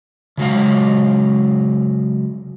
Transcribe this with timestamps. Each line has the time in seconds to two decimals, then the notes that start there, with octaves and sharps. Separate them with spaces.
0.38 C#3 F#3 G#3 F5